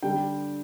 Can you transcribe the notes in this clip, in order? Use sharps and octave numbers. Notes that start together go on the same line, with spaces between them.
D3 G3 D4 G5